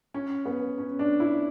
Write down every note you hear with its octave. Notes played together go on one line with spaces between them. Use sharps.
C#4
B3
C#4
D4
E4